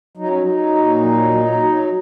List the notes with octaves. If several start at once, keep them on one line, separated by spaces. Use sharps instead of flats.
F#3 D#4
C#4
D#4
F#3
A#2
F#3
F#3
F#3